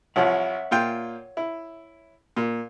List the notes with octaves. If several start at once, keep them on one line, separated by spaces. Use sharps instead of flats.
C2 F3 C#5 E5 F#5
A#2 F4 G5
E4
A#2